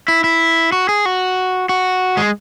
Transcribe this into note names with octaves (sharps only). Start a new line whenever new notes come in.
E4
E4
F#4
G#4
F#4
F#4
G#3